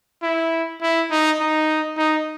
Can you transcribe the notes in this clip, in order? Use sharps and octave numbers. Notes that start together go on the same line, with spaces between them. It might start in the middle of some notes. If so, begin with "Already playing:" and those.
E4
E4
D#4
D#4
D#4